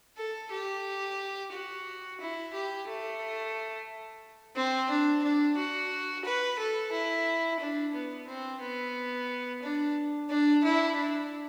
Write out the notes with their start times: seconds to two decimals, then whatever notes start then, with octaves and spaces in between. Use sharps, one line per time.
0.17 A4
0.51 G4
1.52 F#4
2.20 E4
2.54 G4
2.87 A3
4.56 C4
4.90 D4
5.23 D4
5.57 F#4
6.25 B4
6.59 A4
6.92 E4
7.60 D4
7.94 B3
8.27 C4
8.61 B3
9.63 D4
10.30 D4
10.63 E4
10.96 D4